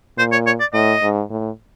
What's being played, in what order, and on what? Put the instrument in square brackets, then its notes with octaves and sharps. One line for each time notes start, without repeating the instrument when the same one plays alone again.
[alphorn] A#2 [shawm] C5
[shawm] C#5
C#5
D5
[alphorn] A2 [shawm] D#5
[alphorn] G#2
A2